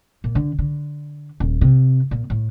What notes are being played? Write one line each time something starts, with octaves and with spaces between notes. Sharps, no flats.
A#2
D3
D3
D#1
C3
A#2
A2